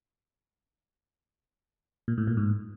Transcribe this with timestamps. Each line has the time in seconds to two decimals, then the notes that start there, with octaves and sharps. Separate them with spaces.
2.08 A#2
2.18 A2
2.27 A#2
2.37 G#2